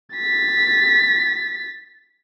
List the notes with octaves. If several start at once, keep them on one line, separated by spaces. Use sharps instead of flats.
A6 B6